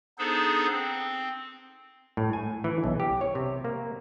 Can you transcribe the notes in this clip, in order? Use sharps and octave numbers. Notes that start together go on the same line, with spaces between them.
B3 D4 D#4 G#4 A4 C5
C4
A2
G#5
E3
B1
G4
C#5
C3
A#3